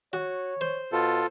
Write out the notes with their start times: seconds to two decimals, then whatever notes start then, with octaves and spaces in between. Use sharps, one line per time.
0.13 F#4 C#5
0.61 C5
0.92 B2 F4 A4